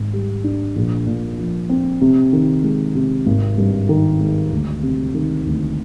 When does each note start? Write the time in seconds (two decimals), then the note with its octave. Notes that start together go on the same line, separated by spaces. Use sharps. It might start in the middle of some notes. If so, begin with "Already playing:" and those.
Already playing: G#1 G#2
0.13 G3
0.44 D4
0.76 A#1
1.07 A#2
1.39 F3
1.69 C4
2.01 C3
2.33 D#3
2.63 G#3
2.95 C3
3.26 G#1
3.58 G2
3.89 D#3
4.20 G#3
4.51 D2
4.83 C3
5.15 D#3
5.46 D2